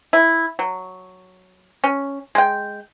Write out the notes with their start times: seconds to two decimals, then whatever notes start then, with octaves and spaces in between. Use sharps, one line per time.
0.13 E4
0.59 F#3
1.84 C#4
2.35 G#3 G5